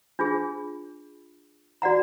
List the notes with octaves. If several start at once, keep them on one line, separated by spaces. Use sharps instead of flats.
D4 F4 G#4
F#4 D5 F#5 A#5